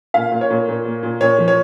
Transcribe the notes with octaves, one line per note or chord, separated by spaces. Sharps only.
A#2 F5
A#2
C#5
A#2
A#2
A#3
A#2
A#2 C#5
F3
C#5